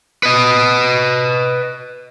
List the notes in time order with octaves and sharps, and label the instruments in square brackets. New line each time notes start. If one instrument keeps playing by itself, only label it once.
[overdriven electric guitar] B4 D#5